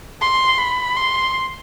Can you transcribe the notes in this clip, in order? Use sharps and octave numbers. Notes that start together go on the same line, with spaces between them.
C6
B5
C6